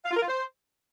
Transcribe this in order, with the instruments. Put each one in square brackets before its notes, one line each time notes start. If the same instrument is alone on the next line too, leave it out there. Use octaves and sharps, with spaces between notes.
[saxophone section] F5
F4
A#4
F4
C5